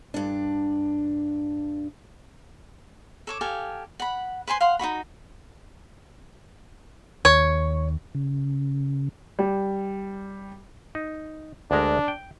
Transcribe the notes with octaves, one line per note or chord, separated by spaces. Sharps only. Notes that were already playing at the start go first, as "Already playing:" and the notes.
G2 D4
A4 C#5 D6
G4 A4 F5 G#5
F#5 B5
B4 C5 G#5 C6
F5 F#5 C6
D#4 F4 F#4 B5
D#2 C#5
C#3
G3
D#4
D2 G#3 D4 A#4
G5